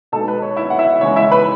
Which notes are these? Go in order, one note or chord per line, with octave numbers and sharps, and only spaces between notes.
B2 G#3 B3 D#4 A4 A5
B4
C#5
E4 E5
F#5
E4 E5
C#3 E3 G#3 C#5
E4 E5
B4 B5